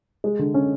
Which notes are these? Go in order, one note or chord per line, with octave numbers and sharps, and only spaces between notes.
G#3
D3
C#4